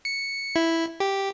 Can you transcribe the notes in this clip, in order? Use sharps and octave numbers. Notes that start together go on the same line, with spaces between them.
C#7
E4
G4